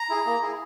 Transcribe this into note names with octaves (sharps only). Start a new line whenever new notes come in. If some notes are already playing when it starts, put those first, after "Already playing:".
Already playing: A#5
E4 G#4
A#3
E4 G#4